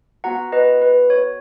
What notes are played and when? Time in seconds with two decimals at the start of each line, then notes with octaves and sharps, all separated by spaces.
0.24 B3 F#4 F#5 A#5
0.52 B4 D#5
0.82 B4
1.10 C#5